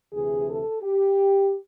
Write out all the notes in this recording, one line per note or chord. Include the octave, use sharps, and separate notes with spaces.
D2 C3 E3 G#4
A4
G4